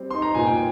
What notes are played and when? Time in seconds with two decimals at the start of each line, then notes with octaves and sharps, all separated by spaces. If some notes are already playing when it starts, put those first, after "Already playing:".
Already playing: G3 C4
0.10 D#4 C6
0.22 A#5
0.35 A#2 G#5
0.46 G5